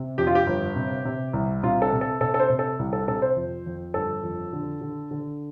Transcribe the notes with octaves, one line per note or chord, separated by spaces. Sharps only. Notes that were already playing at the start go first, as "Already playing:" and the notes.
Already playing: C3
F2 G4
F4
G4
G1
C3
C3
C2
C3 F4
A4
C3
A4
C3 A4
A4
C5
C3
A4
C2
A4
C3 A4
C5
F2
F2
G1 A4
F2
D3
D3
D3